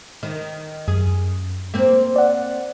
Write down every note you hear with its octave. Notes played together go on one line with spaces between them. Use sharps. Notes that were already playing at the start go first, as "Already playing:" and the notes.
D#3
F#2 G#4
A#3 C4
D5 F#5